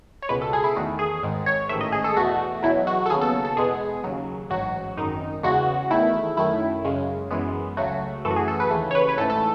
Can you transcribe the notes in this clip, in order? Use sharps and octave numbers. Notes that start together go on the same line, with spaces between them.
C#5
C#2 B2 G#3 B4
A4
G#4
E4
E2 D#3 A3 F#4
G#4
G#1 G#2 D#3 G#3
C#5
A1 G#2 D#3 A3 E5
D#5
G#4
A4
E2 B2 A3 F#4
E2 B2 F#3 E4
F#4
A4
D#2 C#3 F#3 B3 G#4
A4
A4
E2 B2 G#3 B3 G#4
D#2 C#3 F#3
A1 G#2 F#3 F#4
G#1 F#2 D#3 D#4
E2 C#3 G#3 F#4
E2 D#3 A3 E4
F#2 D#3 A3 E4
F#2 C#3 G#3
F#2 E3 G#3 B3
C#2 C#3 F#3 A3 F#4
F#2 E3 A3 A4
F#4
G#4
A4
B4
D#2 C#3 E3 A3
C#5
B4
B4
A1 G#2 E3 A3 A4
A4